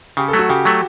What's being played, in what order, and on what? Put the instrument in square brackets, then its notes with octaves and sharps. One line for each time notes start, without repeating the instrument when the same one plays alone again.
[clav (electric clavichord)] C#3 [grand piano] G4
[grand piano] A4
[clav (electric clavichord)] F#3 A3
[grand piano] F#4
[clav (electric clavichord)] C#3 [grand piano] G4
[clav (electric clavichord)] F#3 A3